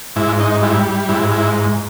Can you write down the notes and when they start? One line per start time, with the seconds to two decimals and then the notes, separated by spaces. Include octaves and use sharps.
0.16 G#2 E4
0.40 D#4
0.62 G3 E4
1.09 G#2 E4
1.32 E4